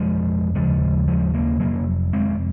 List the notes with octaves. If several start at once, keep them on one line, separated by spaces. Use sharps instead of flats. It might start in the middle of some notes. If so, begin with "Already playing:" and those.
Already playing: F2 C3 F3 G#3
D#2 C#3 F3 G#3
F3 G#3
F#3 A#3
F2 C3 F#3 A#3
G#3 C4